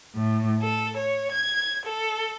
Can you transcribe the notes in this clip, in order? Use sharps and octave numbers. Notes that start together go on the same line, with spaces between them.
A2
A4
C#5
G#6
A4